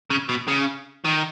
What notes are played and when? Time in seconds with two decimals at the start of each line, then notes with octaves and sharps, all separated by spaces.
0.10 C#3
0.29 B2
0.48 C#3
1.05 D#3